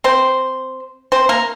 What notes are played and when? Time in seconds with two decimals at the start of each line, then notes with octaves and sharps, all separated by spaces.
0.04 C4 C5
1.12 C4 C5
1.29 A#3 A#4